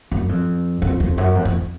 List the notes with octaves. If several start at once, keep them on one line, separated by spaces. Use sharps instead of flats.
F#2
F2
F2
F2
F#2
F2
F2